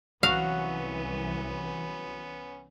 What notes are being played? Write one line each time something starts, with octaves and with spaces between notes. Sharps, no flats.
C2 E3 F#3 B3 C#4 F#4 F5